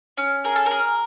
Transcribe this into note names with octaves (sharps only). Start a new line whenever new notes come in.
C#4
G#4 A#4
A4
A#4
G#4